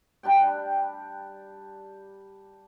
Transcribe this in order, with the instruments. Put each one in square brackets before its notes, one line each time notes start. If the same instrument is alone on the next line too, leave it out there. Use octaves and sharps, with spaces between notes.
[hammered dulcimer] G3 D4 G4 G5